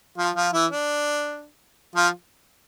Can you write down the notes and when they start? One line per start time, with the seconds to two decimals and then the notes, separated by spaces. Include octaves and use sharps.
0.18 F3 F4
0.36 F3 F4
0.53 E3 E4
0.71 D4
1.96 F3 F4